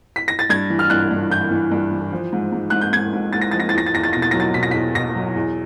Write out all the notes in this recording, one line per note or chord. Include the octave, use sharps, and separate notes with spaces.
B6
A#6
A6
G2 G#6
E3
F6
G2 F#6
G2
E3 G6
E3
G2
E3
F3
G#2
G#2
G#2 F#6
G6
G#2 G#6
G#2
G#2 A6
A#6
F3 A6
A#6
A6
E2 A#6
A6
E2 A#6
A6
B2 A#6
A6
F#3 A#6
A6
B2 B6
A#6
B6
E2
B2 A#6
F#3
E2